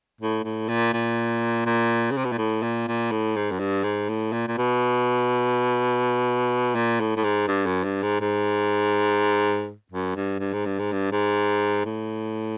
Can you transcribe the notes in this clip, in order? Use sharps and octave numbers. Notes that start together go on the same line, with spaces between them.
A2
A2
A#2
A#2
A#2
C#3
C3
B2
A#2
A2
A#2
A#2
A2
G#2
F#2
G2
G#2
A2
A#2
A#2
B2
A#2
A2
A2
G#2
G2
F#2
G2
G#2
G#2
F#2
G2
G2
G#2
G2
G#2
G2
G#2
A2